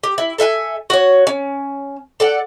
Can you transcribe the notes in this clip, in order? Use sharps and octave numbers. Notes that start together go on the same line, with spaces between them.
G4
E4
A4 E5 F5 G#5
F#4 C#5
C#4
A4 D5 F#5